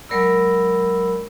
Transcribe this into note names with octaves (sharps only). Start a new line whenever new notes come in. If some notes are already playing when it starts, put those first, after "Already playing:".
F#3 G#3 A#4 D5 B5 E6